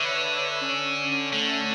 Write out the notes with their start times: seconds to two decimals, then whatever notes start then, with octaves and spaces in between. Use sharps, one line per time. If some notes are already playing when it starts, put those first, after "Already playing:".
Already playing: D3 B4 C#5 E5
0.61 C#4
1.32 D3 A3